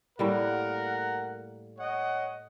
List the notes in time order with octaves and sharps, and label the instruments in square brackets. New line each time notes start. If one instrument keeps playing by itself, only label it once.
[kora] A2 G3 A#3 [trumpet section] A#4 F#5
[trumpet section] C#5 D#5 F#5